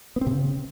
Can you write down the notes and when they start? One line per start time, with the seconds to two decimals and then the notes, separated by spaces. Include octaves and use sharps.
0.16 B3
0.21 C4
0.27 C3
0.32 C#3